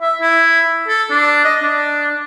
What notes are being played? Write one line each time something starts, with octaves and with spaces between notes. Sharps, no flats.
E5
E4
A4
D4
D#5
D4